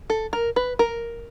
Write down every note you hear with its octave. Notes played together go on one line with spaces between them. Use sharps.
A4
A#4
B4
A#4